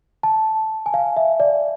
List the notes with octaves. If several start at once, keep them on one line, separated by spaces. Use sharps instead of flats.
A5
G#5
F5
E5
D5